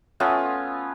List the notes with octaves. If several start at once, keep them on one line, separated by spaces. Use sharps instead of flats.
A3 B3 C#4 F4